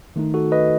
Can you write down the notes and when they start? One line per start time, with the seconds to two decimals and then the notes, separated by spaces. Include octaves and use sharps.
0.16 D#3 A3 D#4
0.34 F#4 A4
0.52 B4 D#5